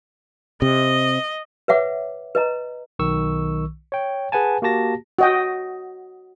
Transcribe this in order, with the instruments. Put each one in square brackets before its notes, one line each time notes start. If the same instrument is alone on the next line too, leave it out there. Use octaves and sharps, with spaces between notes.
[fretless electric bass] C3 [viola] D#5
[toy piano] B4 C#5 E5 F#5 D6
B4 D#5 A#5
[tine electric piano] B1 D#3 C#6 E6
C#5 G5
G#4 B4 F#5 G#5 A5
A#3 F#4 G4 A5 A#6
[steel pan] F#4 D#5 G5